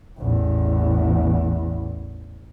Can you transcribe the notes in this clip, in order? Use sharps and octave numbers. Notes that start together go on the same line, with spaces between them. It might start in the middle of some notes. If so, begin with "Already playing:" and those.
A1 E2